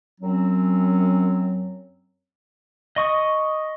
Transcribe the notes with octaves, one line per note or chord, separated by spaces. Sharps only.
F#2 F#3 C4 C#4
D#5 C#6 D#6